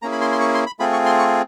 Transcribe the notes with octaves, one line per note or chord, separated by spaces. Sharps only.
A#3 C#4 E4 G#4 A#5
B5
C6
C6
C#6
C6
B5
A3 C4 F4 G#4 B5
C#6
C6
C#6